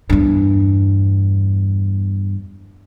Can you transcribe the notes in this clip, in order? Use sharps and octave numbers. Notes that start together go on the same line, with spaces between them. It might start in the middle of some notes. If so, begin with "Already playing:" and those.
E2 G2